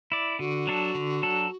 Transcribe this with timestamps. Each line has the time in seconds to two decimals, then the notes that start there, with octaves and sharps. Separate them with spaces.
0.12 E4 D5
0.39 D3 F#4
0.67 F#3 D4 A4
0.95 D3
1.22 F#3 D4 A4